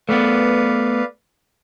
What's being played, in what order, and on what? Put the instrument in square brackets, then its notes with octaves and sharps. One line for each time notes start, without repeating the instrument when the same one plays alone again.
[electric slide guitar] A3 B3 [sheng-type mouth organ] B4 D5 F5